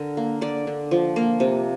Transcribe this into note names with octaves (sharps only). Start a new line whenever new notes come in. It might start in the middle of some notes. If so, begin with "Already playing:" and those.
Already playing: D3 A#4
A#3
D3 D5
D3
F3
A#3
C3